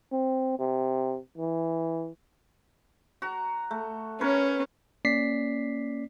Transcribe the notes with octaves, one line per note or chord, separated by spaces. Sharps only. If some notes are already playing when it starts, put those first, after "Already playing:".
C4
C3
E3
F#4 A#5
A3
C#4 A#4 B4 C#5
A#3 C#4 D5 B6 C7